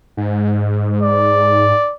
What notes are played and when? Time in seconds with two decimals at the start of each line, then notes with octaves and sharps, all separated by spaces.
0.17 G#2
1.02 D5